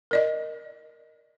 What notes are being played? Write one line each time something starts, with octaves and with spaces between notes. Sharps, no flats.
A#4 D5 D#5